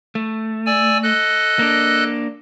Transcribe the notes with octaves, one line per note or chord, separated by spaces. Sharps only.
A3
D5 G#5 E6
A4 D#5 F#6
A#3 D4